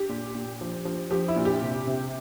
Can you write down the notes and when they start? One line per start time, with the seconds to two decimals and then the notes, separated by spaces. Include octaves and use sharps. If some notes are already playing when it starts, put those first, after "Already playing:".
Already playing: G4
0.09 A#2
0.35 A#2
0.61 F3
0.85 F3
1.11 F3 G4
1.28 E4
1.36 A#2
1.45 G4
1.62 C3
1.87 C3